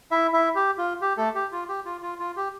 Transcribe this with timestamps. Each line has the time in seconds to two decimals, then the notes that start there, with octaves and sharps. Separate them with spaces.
0.11 E4 E5
0.33 E4 E5
0.55 G4
0.78 F4
1.01 G4
1.17 A3 A4
1.35 G4
1.52 F4
1.68 G4
1.85 F4
2.02 F4
2.20 F4
2.37 G4